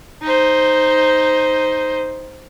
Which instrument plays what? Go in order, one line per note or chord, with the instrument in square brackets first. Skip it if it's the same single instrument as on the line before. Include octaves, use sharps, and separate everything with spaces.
[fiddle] D#4 C5